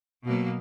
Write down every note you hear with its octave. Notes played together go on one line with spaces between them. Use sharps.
B2 F#3 A#3